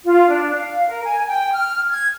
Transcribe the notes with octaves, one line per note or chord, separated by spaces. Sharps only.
F4
D4
F5
A#4
G#5
G5
F6
G#6